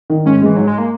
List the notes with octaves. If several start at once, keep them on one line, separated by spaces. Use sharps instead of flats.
D#3
G#2 C#4
E3 G#3
G#2 F#3
G#3
A#3